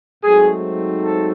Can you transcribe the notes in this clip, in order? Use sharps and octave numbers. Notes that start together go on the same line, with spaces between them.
G#2 F#3 A3 C4 D#4 G#4
A4